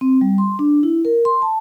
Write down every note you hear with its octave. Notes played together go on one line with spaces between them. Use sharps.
C4
G3
C6
D4
E4
A#4
C6
A5